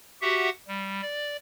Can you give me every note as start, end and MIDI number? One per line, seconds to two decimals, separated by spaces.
0.22 0.49 66
0.22 0.49 67
0.22 0.49 76
0.22 0.49 78
0.68 1.01 55
1.02 1.36 74